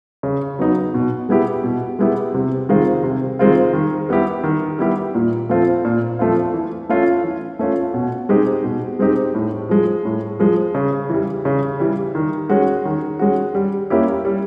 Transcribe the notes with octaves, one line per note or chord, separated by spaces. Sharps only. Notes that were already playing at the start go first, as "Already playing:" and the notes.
C#3
F#3 B3 D#4
B2
G#3 B3 E4 G4
B2
G#3 B3 E4 G4
C3
D#3 G#3 C4 F4
C3
D#3 G#3 C4 F4
D#3
G3 B3 E4 G4
D#3
G3 B3 E4 G4
A#2
F3 A3 C4 F4
A#2
F3 A3 C4 F4
E3
A3 C#4 F4
E3
A3 C#4 F4
B2
G#3 C4 D#4 G4
B2
G#3 C4 D#4 G4
A2
F3 G#3
A2
F3 G#3
C#3
E3 G3
C#3
E3 G3
D#3
G#3 C#4 F#4
D#3
G#3 C#4 F#4
G3
A#3 C#4 E4 G4
G3